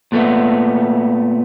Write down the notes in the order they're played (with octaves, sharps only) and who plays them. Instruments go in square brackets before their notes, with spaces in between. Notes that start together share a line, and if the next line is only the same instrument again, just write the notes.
[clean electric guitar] A#2 A3 B3